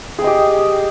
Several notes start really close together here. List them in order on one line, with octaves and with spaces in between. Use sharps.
G#4 G5 D#5 G4